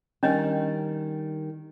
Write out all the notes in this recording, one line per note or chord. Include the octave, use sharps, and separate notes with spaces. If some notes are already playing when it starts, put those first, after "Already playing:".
D#3 G3 C#4 D4 D#5